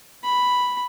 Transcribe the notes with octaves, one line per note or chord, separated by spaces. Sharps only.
B5